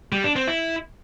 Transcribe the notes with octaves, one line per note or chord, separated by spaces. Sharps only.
G3
D4
C4
E4